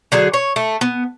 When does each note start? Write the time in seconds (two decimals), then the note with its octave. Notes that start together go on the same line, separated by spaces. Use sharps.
0.12 D3 F#3 G#4
0.33 C#5
0.56 A3
0.81 B3